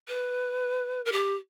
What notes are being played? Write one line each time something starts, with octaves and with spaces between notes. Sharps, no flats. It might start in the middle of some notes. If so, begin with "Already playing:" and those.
B4
A#4
G4